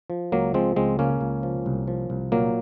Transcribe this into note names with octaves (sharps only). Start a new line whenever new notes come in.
F3
C#2 F#3 A#3
F3 G#3 C4
C#2 G#3 C4
C#3 A#3 C#4
C#2
F3
C2
F3
C2
A#2 F#3 A#3